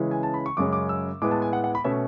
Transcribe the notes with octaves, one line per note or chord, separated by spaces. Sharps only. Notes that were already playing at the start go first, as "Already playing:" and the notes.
Already playing: C#3 E3 G#3 C#4
G#5
A5
B5
C#6
F#2 C#3 G#3 C#4 D6
D6
E6
A2 G#3 B3 D6
A5
G#5
F#5
F#5
B5
B2 A3 C#4 E5